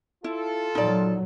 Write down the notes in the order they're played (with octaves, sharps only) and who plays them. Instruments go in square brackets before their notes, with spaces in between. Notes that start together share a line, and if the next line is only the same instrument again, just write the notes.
[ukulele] E4 [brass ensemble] F4 A4
[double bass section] A#2 F#3 [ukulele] D#4 D5